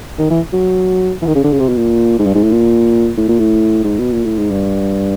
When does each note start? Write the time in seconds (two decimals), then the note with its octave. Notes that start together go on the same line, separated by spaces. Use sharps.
0.19 D#3
0.30 E3
0.53 F#3
1.22 E3
1.27 D#3
1.35 C#3
1.44 D3
1.52 C#3
1.60 C3
1.69 B2
1.77 A#2
2.19 G#2
2.26 G2
2.35 G#2
2.43 A2
2.52 A#2
3.18 A2
3.28 A#2
3.39 A2
3.84 G#2
3.99 B2
4.12 A#2
4.25 A2
4.38 G#2
4.51 G2